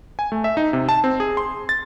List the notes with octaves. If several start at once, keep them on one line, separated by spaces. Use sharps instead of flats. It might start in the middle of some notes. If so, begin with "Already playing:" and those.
G#5
A3
E5
D#4
C3
A5
C4
G#4
C6
A6